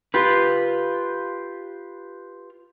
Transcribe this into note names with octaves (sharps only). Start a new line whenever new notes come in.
F4 G4 B4